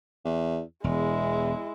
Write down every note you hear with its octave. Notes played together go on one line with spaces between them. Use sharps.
E2
E1 E2 G#3 E4